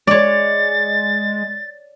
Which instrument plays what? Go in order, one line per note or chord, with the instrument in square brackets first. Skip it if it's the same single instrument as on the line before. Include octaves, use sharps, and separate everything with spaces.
[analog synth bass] G#3 [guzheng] C#5 D5 [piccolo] A6